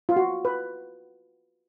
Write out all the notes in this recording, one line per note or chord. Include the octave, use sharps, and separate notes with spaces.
F4
F#4
B4